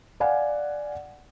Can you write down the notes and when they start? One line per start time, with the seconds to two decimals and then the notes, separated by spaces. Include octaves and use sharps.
0.20 D5 F5 F#5 G#5